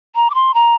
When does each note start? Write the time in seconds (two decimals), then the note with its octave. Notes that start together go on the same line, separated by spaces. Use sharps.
0.15 A#5
0.30 D6
0.34 C6
0.54 A#5